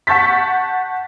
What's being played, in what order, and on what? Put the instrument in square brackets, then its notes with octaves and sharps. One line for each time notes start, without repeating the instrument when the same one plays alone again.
[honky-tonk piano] F#5 A5 C#6 G6 A6 B6